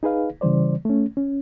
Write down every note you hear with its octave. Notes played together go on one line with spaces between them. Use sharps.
D#4 G#4 B4 F5
C#3 E3 G3 C5 D5
A3 C#4
C#4